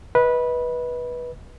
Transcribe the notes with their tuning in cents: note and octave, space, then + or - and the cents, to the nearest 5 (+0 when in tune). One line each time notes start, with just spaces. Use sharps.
B4 -15 D#5 +30